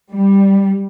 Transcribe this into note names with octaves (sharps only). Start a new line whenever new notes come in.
G3